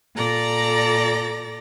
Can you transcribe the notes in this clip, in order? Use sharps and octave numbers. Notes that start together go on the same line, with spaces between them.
A#2 A4 D5 A#5 A#6